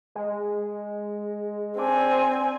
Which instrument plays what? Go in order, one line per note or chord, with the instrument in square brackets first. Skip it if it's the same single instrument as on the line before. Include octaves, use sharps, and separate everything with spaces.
[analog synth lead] G#3
[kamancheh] C4 G#5 [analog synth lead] D4